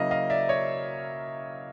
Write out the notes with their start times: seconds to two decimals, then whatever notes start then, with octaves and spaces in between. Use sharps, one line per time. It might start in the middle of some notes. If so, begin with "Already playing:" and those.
Already playing: C#3 F#3 A#3 C#4 E4 D#5 F5
0.11 D#5 F5
0.30 D5 E5
0.49 C#5 D#5